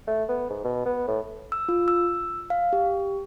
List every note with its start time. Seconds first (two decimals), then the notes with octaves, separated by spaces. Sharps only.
0.07 A3
0.29 B3
0.50 G#2
0.64 B2
0.85 B3
1.08 A2
1.52 E6
1.69 F4
1.88 E6
2.50 F5
2.73 G4